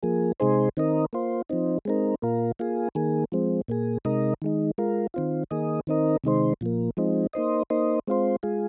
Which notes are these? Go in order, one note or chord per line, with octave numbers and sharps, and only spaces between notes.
F3 A#3 G#4
C3 G#3 D#4 G#4 C5
D#3 C4 D#4 A#4 D#5
A#3 F4 C5
F3 C4 D#4
G#3 C4 D#4 A#4
A#2 A#3 F4 A#4
A#3 F4 G#4
D#3 A#3 G#4
F3 G#3 C4
A#2 A#3 G#4
C3 G#3 D#4 A#4 D#5
D#3 G#3 D#4
G#3 F4 A#4
D#3 C4 F4
D#3 A#3 G#4 D#5
D#3 C4 D#4 A#4 D#5
C3 D#3 G#3 D#4 C5
A#2 F3 A#3
F3 G#3 C4 D#4
A#3 D#4 C5 D#5
A#3 D#4 C5 D#5
G#3 C4 F4 C5
G#3 F4 G#4